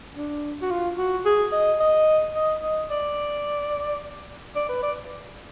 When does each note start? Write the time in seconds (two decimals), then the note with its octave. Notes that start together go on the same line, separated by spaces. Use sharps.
0.15 D4
0.62 F#4
0.70 F4
0.98 F#4
1.25 G#4
1.52 D#5
1.80 D#5
2.35 D#5
2.63 D#5
2.90 D5
4.55 D5
4.69 B4
4.82 D5